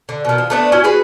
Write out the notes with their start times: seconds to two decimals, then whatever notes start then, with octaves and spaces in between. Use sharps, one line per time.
0.09 D3
0.25 B2 D#3
0.38 F3
0.50 A3 B3 D4
0.72 C#4 E4 F#4 G#5
0.84 F#4 G#4 B4